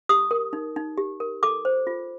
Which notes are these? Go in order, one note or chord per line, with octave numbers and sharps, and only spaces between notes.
G4 D#6
A#4
D#4
D#4
G4
A#4
A4 D6
C5
F4